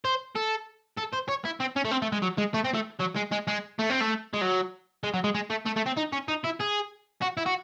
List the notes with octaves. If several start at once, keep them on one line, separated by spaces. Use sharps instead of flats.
C5
A4
A4
C5
C#5
E4
C4
C#4
A3
C4
A3
G#3
F#3
G#3
A3
C4
A3
F#3
G#3
G#3
G#3
A3
C4
A3
G#3
F#3
G#3
F#3
G#3
G#3
A3
A3
A3
C4
D#4
C#4
D#4
E4
G#4
F#4
E4
F#4